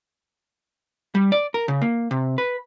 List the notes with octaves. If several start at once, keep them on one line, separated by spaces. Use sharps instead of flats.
G3
D5
A#4
C#3
A#3
C3
B4